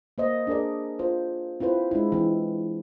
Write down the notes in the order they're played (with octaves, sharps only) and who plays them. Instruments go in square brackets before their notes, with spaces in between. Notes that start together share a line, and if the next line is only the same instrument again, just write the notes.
[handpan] A#3 C5 D#5
D4 G#4 A#4 D5
F4 C5
C4 E4 F4 B4 C5
G#3 D4 E4
E3 C4